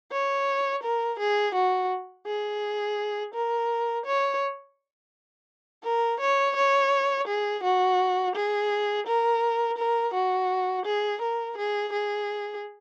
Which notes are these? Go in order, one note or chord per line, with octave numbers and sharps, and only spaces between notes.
C#5
A#4
G#4
F#4
G#4
A#4
C#5
A#4
C#5
C#5
G#4
F#4
G#4
A#4
A#4
F#4
G#4
A#4
G#4
G#4